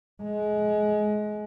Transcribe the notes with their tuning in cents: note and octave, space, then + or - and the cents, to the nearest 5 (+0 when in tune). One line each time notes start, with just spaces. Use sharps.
G#3 +25